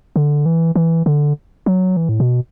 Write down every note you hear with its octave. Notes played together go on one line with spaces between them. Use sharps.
D3
E3
E3
D3
F#3
E3
A2
B2